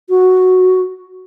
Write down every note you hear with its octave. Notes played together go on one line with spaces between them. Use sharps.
F#4